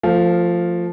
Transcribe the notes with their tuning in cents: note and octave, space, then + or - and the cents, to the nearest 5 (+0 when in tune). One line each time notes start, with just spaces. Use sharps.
F3 +0 A3 +25 F5 +0